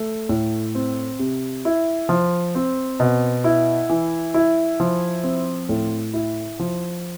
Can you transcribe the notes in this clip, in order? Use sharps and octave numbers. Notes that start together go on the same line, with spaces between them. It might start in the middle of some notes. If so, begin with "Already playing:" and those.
Already playing: A3
A2
C4
C3
E4
F3
C4
B2
E4
E3
E4
F3
C4
A2
E4
F3